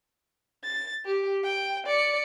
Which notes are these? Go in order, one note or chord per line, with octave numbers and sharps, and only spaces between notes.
A6
G4
G5
D5 C#7